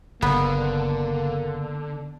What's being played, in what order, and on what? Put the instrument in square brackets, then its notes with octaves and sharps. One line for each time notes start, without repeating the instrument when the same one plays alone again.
[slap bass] F#1 [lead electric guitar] D3 [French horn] A#3 [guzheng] B3